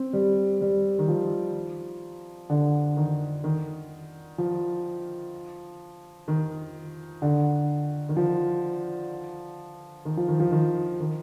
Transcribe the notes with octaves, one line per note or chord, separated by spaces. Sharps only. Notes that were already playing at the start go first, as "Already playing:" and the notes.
Already playing: C4
G3
G3
D#3
F3
D3
D#3
D#3
F3
D#3
D3
D#3
F3
D#3
F3
D#3
F3
D#3
D#3